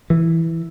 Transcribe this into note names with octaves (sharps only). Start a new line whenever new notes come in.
E3